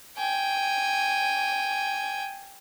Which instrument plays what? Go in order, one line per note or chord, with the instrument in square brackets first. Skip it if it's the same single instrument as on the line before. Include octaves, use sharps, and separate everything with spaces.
[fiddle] G5 G#5